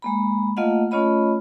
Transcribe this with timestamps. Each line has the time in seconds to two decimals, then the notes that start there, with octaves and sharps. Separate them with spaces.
0.02 G#3 A#3 B5
0.57 A3 A#3 F4 D#5 F5 F#5
0.91 A3 C#4 F4 C#5 D#5 B5